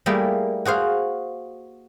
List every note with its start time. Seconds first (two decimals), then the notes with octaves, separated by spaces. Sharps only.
0.06 G3 A3 A#3 E4 G#4
0.65 F#4 G#4 C5 F5